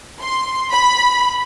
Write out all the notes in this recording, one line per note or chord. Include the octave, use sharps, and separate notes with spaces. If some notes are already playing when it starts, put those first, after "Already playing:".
C6
B5